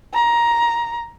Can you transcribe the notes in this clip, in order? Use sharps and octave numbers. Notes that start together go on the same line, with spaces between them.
A#5